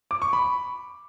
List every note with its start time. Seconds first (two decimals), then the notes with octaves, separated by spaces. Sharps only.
0.11 D6
0.22 C#6
0.33 B5